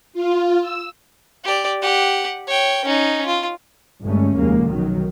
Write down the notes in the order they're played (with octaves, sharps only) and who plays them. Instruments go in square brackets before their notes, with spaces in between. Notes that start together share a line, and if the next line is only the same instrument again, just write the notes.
[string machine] F4
E6
[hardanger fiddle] G4 D5
G4 F#5
C#5 G5
C#4 D#4
F4
[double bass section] G1 G2 G#3 A3 C#4
F1 D#2 G#3 A#3
B1 D#3 F#3